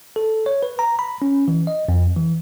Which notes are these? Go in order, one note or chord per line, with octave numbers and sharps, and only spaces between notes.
A4
C#5
B4
A#5
B5
C#4
E3
D#5
F2
E3